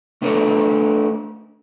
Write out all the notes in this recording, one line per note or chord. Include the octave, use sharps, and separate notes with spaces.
A3 D4 A4 B4 C#5